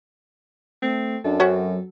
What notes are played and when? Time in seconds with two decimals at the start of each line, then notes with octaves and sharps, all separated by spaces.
0.82 A3 C4
1.24 F#2 D4 A4
1.40 F#3 C4 C#4 F#4